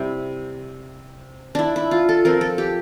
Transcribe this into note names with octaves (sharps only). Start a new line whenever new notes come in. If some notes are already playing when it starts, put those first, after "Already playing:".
Already playing: C3 G3 C4 E4
D4 E4
E4
F4
A4
F3 C4 A#4
A4
G4